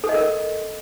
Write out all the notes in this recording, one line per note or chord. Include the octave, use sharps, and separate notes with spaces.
A4
D#5
A#4